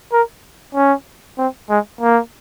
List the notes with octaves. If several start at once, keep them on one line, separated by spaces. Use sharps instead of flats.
A#4
C#4
C4
G#3
A#3